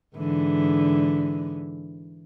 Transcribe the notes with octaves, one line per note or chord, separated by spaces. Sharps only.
G#2 D3 E3